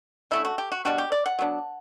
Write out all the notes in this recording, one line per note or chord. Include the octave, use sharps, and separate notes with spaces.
D3 A3 C#4 E4
F#4
G4
F#4
B2 G3 B3 D4 F#4
G4
D5
F#5
F#3 B3 D4